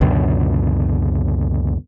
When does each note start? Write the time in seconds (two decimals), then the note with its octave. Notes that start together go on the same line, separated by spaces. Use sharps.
0.01 C#2 F#2 B2 D3